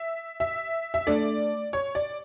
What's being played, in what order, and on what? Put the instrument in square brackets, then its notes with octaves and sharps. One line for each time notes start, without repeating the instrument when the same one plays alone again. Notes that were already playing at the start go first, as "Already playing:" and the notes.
Already playing: [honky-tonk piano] E5
E5
E5
[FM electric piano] A3 D4 A4 [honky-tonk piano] D5
[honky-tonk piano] C#5
D5